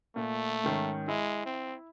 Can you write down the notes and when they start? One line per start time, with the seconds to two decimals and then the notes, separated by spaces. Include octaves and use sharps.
0.16 A#2 A3
0.64 G#2 D#3 C#4
1.08 G#3 E4
1.45 C4